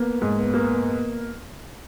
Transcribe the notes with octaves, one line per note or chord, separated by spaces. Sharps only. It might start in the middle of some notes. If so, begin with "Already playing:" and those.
Already playing: A#3 B3
G#2
B3
A#3